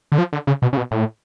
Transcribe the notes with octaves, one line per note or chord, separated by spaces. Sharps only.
D3
F3
D3
C#3
B2
C#3
B2
A2